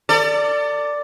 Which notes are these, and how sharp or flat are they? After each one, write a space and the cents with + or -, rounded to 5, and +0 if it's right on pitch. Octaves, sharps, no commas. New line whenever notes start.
A4 +40 D5 +0